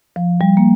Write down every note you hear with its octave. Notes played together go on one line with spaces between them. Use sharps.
F3
G3
A#3